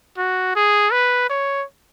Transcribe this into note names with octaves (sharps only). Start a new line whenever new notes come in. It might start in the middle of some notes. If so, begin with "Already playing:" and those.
F#4
G#4
B4
C#5